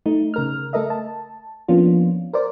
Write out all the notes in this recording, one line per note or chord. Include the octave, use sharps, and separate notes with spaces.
A3 D#4
C#3 A#4 F6
A3 A4 A#4 D#5 E5
A5
F3 A#3 B3 C#4 D4 F4
A#4 C5 D5